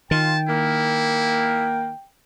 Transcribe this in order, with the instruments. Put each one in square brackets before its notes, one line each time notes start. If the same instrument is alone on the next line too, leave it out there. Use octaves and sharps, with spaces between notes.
[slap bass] D#3 [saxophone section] F4 [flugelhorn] G5 [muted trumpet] A5
[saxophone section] A#3 [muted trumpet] E4